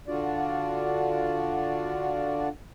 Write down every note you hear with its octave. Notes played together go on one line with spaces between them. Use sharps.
D3 D4 F4 F#4 D5